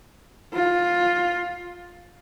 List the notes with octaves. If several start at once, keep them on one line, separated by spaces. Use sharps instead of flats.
F4